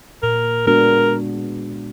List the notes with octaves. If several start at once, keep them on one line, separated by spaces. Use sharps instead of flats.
A#2 A#4
G#3 B3 D4 F#4 A#4